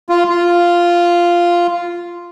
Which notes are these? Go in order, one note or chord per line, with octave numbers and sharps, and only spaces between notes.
F4
F4